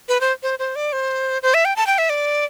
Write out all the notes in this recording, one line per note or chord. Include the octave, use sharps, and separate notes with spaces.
B4
C5
C5
C5
D5
C5
C5
E5
G5
A5
G5
E5
D5